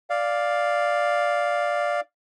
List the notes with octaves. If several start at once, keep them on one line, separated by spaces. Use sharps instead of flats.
D5 F5